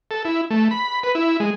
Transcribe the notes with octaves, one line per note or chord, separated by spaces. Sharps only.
A4
E4
A3
B5
B4
E4
G#3